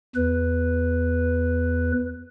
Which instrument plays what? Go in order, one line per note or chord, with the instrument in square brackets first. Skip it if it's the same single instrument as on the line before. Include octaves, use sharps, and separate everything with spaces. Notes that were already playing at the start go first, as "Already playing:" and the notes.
[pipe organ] E2 B4